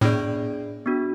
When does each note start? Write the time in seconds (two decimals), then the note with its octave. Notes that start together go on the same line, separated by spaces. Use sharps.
0.01 A2 B3 D4 G#4 D5
0.86 B3 D4 F#4